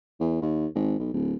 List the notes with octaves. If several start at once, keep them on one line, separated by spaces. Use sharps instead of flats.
E2
D#2
G#1
B1
D1